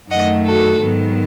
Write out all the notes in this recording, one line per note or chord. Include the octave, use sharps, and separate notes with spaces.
F#2 D#3 A3 D#5 F#5
F#4 A4
G#2 D#3 F#3 B3